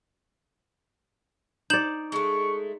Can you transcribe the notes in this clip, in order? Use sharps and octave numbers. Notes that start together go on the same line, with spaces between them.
D#4 D5 G6 E7 F#7
G#3 A3 C#6